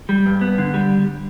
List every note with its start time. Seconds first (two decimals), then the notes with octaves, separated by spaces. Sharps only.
0.09 G3
0.26 G2
0.41 B3
0.58 D3
0.74 G3